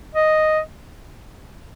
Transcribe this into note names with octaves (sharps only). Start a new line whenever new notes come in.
D#5